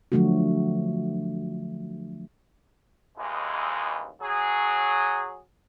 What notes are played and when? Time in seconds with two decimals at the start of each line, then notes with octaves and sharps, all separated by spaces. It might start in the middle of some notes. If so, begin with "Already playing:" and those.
0.12 D3 F3 F#3 A3 D4 F#4
3.16 A1 D#2 E3 G#3
4.20 F#3 G#4